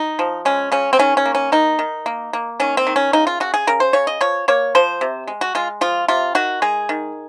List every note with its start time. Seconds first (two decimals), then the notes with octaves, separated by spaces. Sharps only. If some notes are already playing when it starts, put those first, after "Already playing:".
Already playing: D#4
0.19 F3
0.45 G#3 C#4
0.72 C#3 C#4
0.93 C4
0.99 D#3 C#4
1.17 C#4
1.25 A#3
1.35 C#4
1.52 D#3 D#4
1.79 D#3
2.06 A#3
2.33 A#3
2.60 D#3 C#4
2.77 C4
2.87 D#3
2.96 C#4
3.13 C#3 D#4
3.27 F4
3.40 C#3 F#4
3.54 G#4
3.67 C#3 A#4
3.80 C5
3.93 C#3 C#5
4.07 D#5
4.21 F3 C#5
4.48 A#3 C#5
4.75 F3 C5
5.01 C3
5.28 G#3
5.41 F#4
5.55 G#3 F4
5.81 F3 F4
6.08 C3 F4
6.35 D#3 F#4
6.62 G#3 G#4
6.89 D#3